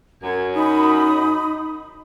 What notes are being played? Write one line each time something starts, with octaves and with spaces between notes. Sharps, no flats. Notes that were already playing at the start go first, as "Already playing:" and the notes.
F#2 G#6
D#4 B5 D#6